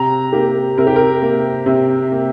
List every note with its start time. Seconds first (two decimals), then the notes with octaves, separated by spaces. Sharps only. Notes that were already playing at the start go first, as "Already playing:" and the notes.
Already playing: C3 A#5
0.33 A#3 G4
0.77 C3 A#4
0.87 G4
0.96 A#4
1.22 A#3
1.66 C3
2.12 A#3